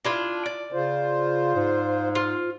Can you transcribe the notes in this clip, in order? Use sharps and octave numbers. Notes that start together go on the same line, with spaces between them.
D4 E4 F4
D5
C#3 F4 C5
G#2
F4